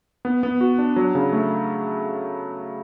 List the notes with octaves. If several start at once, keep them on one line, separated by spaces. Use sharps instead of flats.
B3
B3
F#4
D4
F#3
C#3
A3